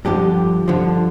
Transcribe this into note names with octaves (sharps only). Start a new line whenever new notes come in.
G2 D3 F3 G4
G2 D3 F3